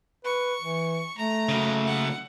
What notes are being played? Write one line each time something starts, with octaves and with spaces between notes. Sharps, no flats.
B4 C#6
E3
A3 A#5
C#3 F#3
F#5